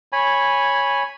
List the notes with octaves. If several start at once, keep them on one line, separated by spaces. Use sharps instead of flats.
C#5 G#5 B5